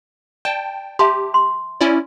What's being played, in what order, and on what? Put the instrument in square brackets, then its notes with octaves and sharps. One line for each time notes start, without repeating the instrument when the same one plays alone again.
[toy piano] D5 [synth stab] G5 A5
[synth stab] G4 [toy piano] E5 A5 C6
[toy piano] C6
[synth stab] C#4 E4 D5